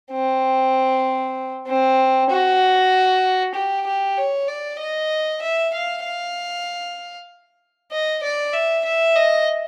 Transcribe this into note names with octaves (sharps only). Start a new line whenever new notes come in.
C4
C4
F#4
G4
G4
C#5
D5
D#5
E5
F5
F5
D#5
D5
E5
E5
D#5